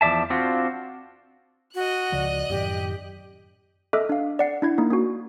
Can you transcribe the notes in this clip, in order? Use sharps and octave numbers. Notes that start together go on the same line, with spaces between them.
E2 F3 D5 E5 A5
C4 D4 F4 F#4
F#4 D#5 F#6
C#2 C#3 F3 D5
F#2 A2 D#3 G4
A4 D#5 E5 D6 F6 F#6
D4 F5
D5 F#5 C7
D4 E4 G#6
A#3 D#4 E4
A#3 C#4 F#4